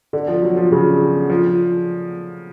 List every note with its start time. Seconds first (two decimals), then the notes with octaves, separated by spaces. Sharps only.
0.13 D3
0.28 F3
0.42 F#3
0.57 F3
0.72 C#3
1.29 F3